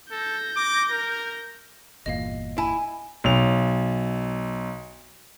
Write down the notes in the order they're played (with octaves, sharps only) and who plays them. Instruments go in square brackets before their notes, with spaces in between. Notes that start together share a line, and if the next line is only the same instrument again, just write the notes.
[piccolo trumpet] A4 [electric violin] G6 A#6
[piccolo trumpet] D6
A#4
[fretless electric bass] G1 E2 A#2 [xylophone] D#5 F5
[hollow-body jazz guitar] E4 [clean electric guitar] G#5
[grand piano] B1 F7